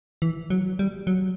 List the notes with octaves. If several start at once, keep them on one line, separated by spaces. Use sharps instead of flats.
E3
F#3
G3
F#3